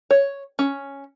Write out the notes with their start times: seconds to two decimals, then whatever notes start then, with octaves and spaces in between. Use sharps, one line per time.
0.11 C#5
0.59 C#4